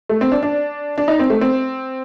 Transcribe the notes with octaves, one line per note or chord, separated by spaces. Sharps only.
A3
C4
D4
D4
D4
D#4
C4
A3
C4